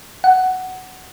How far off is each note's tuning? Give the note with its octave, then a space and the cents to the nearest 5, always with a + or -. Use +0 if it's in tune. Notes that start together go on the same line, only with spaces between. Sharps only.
F#5 +10